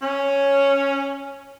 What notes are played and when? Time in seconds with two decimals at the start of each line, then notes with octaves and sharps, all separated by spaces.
0.02 C#4